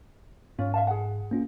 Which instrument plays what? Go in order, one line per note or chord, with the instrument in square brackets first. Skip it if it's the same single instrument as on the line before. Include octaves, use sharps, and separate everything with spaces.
[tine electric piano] G#2 [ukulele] C#4 F4
[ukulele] E5 F5 A5
G#4 F#5
[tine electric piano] A#3 C#4 F4